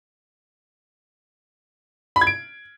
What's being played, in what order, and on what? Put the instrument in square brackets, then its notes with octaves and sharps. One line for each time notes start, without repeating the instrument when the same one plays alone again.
[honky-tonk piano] B5
G#6
D7